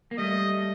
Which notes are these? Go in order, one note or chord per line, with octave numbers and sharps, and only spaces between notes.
A#3
G3 A3 D#5